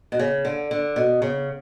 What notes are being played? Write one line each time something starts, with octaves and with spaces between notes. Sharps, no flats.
B2
C#3
D3
D3
B2
C#3